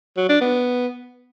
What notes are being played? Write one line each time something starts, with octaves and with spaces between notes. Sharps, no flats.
F#3
D4
B3